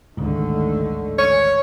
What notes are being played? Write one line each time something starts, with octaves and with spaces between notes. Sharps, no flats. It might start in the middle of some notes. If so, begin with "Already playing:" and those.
A1 D2 G#2 D3 D#3 A3
C#5